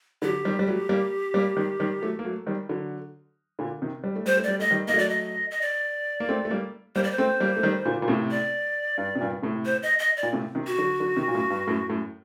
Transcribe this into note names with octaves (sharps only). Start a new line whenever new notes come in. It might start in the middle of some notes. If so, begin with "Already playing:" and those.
D3 F#3 G4
D#3 G3
G3
F#3 A3
G3 A#3
G3 A#3
D#3 G3
D#3 G3
F#3 A3
A#3
F#3 A3
D#3 G3
D3 F#3
A#2 D3
C3 D#3
G3
A3
G3 C5
A3
G3 D5
A3 D#5
D#3 G3
A#3 D#5
F#3 A3 D5
D#5
D#5
D5
A#3
A3 C4
A3
G3 A#3
G3 A#3 C5
D5
C5
A3 C4
G3 A#3
A3
D#3 G3
A#2 D3
A#2
A2 C3
D5
G2
C3
G2 A#2
A2 C3
C5
D#5
D#5
D5
A#2
A2 C3
C3 D#3
F#4
D3 F#3
D3 F#3
C3 D#3
A#2
F#2 A2
G2
F#2 A2
F#2 A2